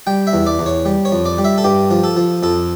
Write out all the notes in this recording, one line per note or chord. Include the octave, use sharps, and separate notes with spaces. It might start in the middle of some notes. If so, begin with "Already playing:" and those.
G3 G5
E5
E2
D5
E2
C#5
G3
C#5
F2
D5
G3
E5
A4
G2 G4
F3
A4
F3
F2 A4